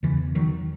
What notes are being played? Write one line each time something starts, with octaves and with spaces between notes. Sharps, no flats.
E2 C#3 E3
D#3 F#3